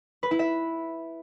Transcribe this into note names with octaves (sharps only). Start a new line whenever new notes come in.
B4
E4
E5